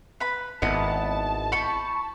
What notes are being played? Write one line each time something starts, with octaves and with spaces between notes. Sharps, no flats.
B4 B5
G#1 B3 E4 D#5 A5 B5 D#6
B5 C#6 G6